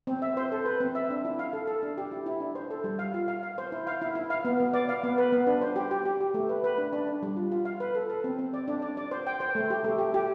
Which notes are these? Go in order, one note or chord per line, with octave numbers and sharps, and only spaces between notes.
C4
E5
C5
A4
B4
C4
E5
D4
E4
F5
A4
A4
D4
G4
E4
E4
D4
C5
A4
G3
F5
F4
F5
F5
C5
E4
F5
E4
E4
F5
B3
B3
D5
F5
B3
B4
B3
D4
C5
G4
G4
G4
G4
A3
B4
B4
D4
D4
D4
G3
F4
F4
F5
B4
A4
A4
C4
C4
D5
D4
D5
D5
C5
G5
C5
A3
G4
A3
G4
G4